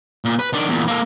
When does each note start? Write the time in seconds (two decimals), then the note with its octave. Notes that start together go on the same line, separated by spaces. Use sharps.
0.25 A#2
0.39 B4
0.53 D#3 D4
0.68 E2 A#2
0.88 A#3 A4